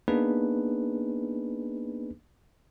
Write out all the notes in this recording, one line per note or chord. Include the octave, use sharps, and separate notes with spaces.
A#3 B3 D4 D#4 G#4 B4